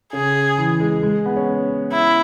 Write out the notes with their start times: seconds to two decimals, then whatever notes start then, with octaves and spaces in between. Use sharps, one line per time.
0.13 C#3 G#4
0.58 E3
0.80 G#3
1.03 G#3
1.26 B3
1.36 C#4
1.92 E4